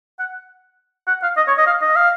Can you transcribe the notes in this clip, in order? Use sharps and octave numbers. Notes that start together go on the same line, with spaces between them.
F#5
F#5
F5
D#5
C#5
D#5
F5
D#5
F5